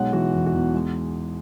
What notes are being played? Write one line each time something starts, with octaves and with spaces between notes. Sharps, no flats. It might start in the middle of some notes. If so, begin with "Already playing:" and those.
Already playing: B1 G#3 C#5 F#5
E3 F#4
E2
F#4
E2
G#3